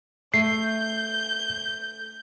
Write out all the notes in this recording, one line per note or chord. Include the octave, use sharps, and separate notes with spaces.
A3 G6 C7